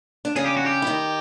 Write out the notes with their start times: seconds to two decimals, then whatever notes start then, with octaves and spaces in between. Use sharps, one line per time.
0.25 D4
0.36 C#3 C#4 G#4
0.46 G4
0.57 F#4
0.66 G4
0.82 E4
0.87 D#3 D#4